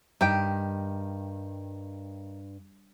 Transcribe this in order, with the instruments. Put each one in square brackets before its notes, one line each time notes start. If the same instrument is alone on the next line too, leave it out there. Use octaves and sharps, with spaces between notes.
[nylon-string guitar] G2 [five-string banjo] D#3 G4 G5